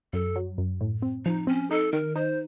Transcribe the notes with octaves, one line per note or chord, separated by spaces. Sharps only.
F#2 A4
F#3
F#2
A2
C4
F3 D#4
C4 C#4
D#4 A4
D#3 A#4
D#4 C5